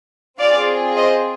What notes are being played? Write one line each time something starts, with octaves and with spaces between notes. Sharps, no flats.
C4 F4 G#4 D5 F5
C5 D#5